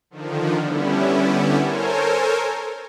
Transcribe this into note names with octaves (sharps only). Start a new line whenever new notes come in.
D3 D#3 F3
D3 G3 B3 C#4 E4
A4 A#4 C5 C#5 G#5